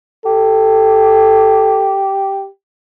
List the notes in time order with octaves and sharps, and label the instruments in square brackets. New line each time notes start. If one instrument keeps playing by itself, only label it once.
[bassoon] G4 [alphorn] A4